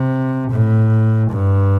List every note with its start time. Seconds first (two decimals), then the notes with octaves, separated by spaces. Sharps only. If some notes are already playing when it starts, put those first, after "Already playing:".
Already playing: C3
0.51 A2
1.31 G2